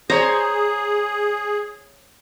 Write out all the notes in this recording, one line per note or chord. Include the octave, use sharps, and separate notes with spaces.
G#4 C5 C#5 A#5